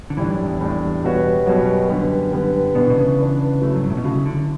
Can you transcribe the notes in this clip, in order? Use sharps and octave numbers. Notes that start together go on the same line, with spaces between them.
D3
A2 E3 G3 D4
F#2
E2
A2 G3 D4
B2 G3 B3 F#4 C#5
F#2 B2 G3 B3 F#4 C#5
D3 G3 B3
D3 G3 B3
B2 E3 B3 D4
B2
C#3
E3 B3 D4
F#3 A3 E4
F#2
G2
A2
B2
C#3 F#3 A3 E4
D3